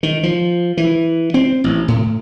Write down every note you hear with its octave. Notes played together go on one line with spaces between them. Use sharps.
D#3
F3
E3
C4
A1
A2